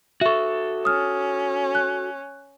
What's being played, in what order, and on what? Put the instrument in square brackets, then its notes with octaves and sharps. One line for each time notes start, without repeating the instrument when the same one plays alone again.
[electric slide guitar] F#4 A4 [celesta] E5 C#6
[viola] C#4 [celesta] D#6 F6
[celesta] F#6